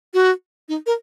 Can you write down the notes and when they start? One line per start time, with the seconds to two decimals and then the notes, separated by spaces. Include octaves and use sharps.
0.14 F#4
0.69 D#4
0.86 A#4